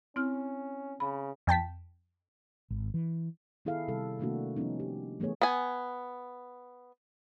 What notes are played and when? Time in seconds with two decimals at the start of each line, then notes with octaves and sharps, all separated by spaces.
0.16 C4 C#4 E4 F6
1.00 C#3 B5
1.47 F2 G5 A5 B6
2.70 G#1
2.94 E3
3.65 D#3 B3 E4 G#4 A4 F5
3.88 C3 G3 A4
4.19 C3 D#3 A3 A#3 D4 F#4
4.56 F3 G3 B3 C#4 D#4
4.80 G4
5.20 E3 A3 B3 G#4 C#5
5.42 B3 G#5